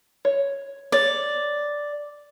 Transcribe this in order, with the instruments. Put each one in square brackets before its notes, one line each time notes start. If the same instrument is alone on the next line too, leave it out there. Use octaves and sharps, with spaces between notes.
[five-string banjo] C#5
[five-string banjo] C#5 [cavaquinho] D5